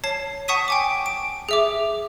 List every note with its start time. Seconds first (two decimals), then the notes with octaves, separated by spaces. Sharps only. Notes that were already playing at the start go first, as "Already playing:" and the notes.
0.04 C#5 A5 C7
0.48 F#5 A5 C#6 D#6 B6 D#7
0.68 G5 G#5 D6
1.06 D7
1.49 G#4 E5 D6